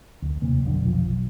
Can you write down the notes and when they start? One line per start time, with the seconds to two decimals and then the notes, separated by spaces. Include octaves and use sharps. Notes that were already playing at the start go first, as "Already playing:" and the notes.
0.22 D2
0.42 D#2 C3 A#3
0.63 F1 B1 D3
0.85 F1 B1 F3
1.06 B1